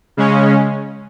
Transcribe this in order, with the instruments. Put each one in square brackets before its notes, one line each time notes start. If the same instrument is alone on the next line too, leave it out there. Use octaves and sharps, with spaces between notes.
[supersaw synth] C#3 G#3 C#4